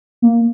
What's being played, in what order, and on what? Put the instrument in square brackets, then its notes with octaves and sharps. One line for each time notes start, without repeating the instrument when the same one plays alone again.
[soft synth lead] A#3